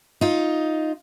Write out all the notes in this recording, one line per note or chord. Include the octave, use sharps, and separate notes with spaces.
D#4 F4